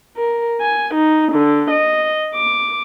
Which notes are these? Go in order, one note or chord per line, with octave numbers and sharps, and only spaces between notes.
A#4
G#5
D#4
D3
D#5
D6